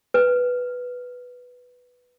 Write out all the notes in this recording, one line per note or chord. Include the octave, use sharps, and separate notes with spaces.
B4